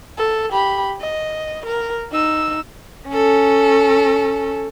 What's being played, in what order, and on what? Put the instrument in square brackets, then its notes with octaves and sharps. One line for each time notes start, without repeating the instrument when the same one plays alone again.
[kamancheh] A4
G4 B5
D#5
A#4
D#4 E6
[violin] C#4 A4